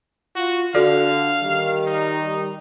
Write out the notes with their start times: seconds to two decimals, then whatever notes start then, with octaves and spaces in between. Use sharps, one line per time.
0.36 F4 F#4
0.75 D3 F#4 A4 D5 F5
1.42 D#3 G3
1.86 D#4